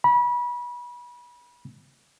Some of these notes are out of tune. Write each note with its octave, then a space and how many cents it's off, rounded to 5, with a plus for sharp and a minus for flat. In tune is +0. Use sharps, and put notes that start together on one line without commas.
B5 -30